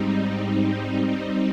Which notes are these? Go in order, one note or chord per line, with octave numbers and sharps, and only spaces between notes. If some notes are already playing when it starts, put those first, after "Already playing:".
Already playing: G#2 G3 C4 D#4
G3 C4 D#4